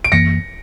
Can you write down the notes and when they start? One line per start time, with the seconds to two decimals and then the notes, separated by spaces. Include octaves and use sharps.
0.04 D7
0.12 F#2 E3 A#3 A#6 C#7